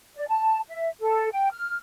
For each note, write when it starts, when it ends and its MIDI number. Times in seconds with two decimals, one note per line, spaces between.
0.16 0.27 74
0.28 0.60 81
0.69 0.89 76
1.00 1.30 69
1.32 1.49 79
1.52 1.78 89